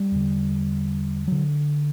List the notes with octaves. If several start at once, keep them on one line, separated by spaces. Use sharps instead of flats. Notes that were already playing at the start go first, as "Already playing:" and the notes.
Already playing: G3
E2 D3
D3 F#3